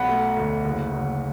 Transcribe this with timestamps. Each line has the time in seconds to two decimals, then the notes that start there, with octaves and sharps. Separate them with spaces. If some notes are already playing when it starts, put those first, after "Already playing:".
Already playing: B1 F#5 B5
0.09 A3
0.37 D2
0.65 F#1
0.92 F#1